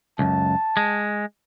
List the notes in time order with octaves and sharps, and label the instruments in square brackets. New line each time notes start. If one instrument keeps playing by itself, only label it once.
[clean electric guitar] C#2 F#2 [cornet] A5
[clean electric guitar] G#3